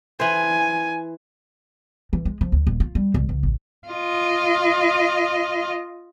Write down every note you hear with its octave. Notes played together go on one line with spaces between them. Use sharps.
E3 C5 G#5
E3
G#3
F3
D2
D#1
F4
G3
C2
C#2
A1
F4 D#5